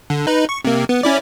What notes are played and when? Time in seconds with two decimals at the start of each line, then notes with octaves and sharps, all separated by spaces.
0.10 D3
0.27 D#4 B4
0.49 C#6
0.65 C3 A#3
0.89 B3
1.03 C#4 E4 D5